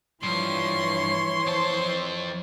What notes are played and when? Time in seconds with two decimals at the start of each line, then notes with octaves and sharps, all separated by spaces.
0.23 G2 E3 F3 C#5 C6
1.47 F2 C5 A5